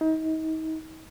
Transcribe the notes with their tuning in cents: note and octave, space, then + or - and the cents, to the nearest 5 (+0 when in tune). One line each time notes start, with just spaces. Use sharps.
D#4 +35